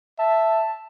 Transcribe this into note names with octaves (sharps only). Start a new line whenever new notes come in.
E5 A5